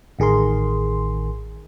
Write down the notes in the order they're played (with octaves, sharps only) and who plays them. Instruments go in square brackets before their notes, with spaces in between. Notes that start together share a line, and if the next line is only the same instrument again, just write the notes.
[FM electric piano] A1 D#3 G#4 A#4 C6